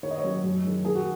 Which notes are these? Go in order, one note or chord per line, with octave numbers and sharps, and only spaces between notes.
D#3 C#5
D#5
C#5
F#3 C#4
F#2
D#3 G#3
D#3 G#4
F#4